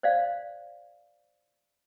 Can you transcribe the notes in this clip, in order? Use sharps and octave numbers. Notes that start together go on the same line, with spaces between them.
C5 D5 F5